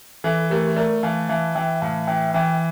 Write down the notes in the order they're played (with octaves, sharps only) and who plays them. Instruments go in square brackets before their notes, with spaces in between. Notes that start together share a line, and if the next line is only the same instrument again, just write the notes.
[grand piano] E3 [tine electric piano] A4
[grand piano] A3 [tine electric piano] G4 A#4
[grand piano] A3 [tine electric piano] A#4 D5
[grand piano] E3 [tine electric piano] F5 A5
[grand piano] E3 [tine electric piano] F5 A5
[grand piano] E3 [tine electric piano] E5 G5
[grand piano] A2 [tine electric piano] F5 A5
[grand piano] E3 [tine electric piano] E5 G5
[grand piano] E3 [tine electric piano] E5 G5